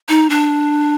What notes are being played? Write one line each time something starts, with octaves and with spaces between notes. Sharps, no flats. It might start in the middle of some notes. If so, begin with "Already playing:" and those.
D#4
D4